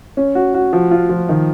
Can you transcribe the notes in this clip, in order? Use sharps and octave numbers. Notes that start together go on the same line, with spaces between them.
C#4
F#4
F#4
F3
F4
F3
D#3